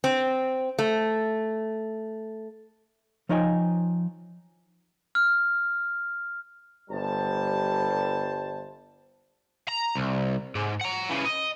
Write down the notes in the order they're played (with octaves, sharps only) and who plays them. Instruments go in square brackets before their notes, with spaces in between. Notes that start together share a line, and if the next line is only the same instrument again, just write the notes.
[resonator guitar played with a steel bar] C4
A3
[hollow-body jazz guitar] F3 D#4 C#5 D#5 G5 G#5
[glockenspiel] F6
[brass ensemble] G1 G3 C5 A5
[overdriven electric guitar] A#5
C2
G#2
F#5 A#5
C#3 E3
D#5